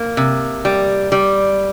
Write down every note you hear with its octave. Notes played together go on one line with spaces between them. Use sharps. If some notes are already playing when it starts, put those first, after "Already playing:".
Already playing: A#3
C3
G3
G3